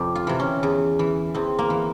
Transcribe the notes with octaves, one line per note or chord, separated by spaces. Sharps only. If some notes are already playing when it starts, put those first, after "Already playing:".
Already playing: F2 C3 G4
F4
C3 E3
C#4
E2
E3
E2 C4
A#3
E3